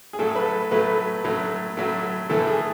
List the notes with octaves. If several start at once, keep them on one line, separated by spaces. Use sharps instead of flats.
G#4
A2 F#3 A3 A4
B4
A4
A2 F#3 A3 B4
A2 F#3 A3
A2 F#3 A3
A2 E3 A3 A4
G#4